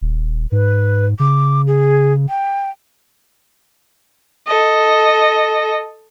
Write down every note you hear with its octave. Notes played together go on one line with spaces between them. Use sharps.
D#1
G#2 B4
C#3 D6
G#4
G5
A4 D#5